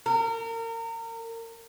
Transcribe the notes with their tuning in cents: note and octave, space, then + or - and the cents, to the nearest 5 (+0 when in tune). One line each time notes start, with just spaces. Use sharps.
A#4 -30